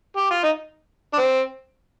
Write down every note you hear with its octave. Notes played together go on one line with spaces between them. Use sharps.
G4
F4
D#4
D4
C4